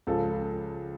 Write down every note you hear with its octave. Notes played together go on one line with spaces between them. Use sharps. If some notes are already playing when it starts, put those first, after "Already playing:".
C#2 C#3 F3 A4